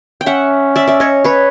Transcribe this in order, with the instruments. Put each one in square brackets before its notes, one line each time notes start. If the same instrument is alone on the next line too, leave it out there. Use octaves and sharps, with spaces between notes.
[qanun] G5
[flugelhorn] C#4 [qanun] E5 F#5
[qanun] D5 E5
D5 E5
C#5 D#5
B4 C#5